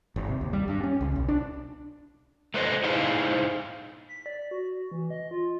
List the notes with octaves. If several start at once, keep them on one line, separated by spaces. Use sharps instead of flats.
G#1
C3
D#2
G3
G2
C#4
C#2
B1
D4
A3 B4 C5 D5 D#5
D#4 E4 G#4 C5 F5
B6
D5
F#4
E3
D#5
F4